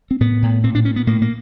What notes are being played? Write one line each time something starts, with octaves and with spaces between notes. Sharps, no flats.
C4
A2 B3
A2
A#2 C4
D4
A#2 C#4
B3
A2 A#3
A#3